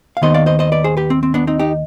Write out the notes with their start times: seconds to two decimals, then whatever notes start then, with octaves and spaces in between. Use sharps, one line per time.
0.17 F5
0.22 D#2 D#3 B3 C5 D#5
0.34 D5 F5
0.46 C5 D#5
0.59 C5 D#5
0.72 B4 D5
0.84 G#4 C5
0.97 G4 B4
1.10 C4
1.23 C4
1.34 B3 D4
1.47 C4 D#4
1.59 D#4 G4